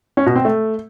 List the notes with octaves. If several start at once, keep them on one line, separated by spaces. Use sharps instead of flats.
C#4
B2
C4
A3